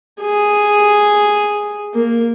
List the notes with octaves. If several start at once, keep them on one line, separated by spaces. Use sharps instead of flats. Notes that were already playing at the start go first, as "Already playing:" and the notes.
G#4
A#3